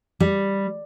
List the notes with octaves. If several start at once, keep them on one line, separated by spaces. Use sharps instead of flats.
G3